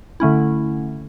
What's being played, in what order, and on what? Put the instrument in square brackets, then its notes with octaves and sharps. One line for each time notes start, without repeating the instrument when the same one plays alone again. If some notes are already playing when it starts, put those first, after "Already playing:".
[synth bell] D3 A3 C#4 E4